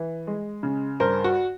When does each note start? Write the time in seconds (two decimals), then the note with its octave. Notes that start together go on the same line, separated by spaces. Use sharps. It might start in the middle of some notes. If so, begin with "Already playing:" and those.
Already playing: E3
0.27 G#3
0.63 C#3
1.00 G2 A#4 C5
1.24 F#4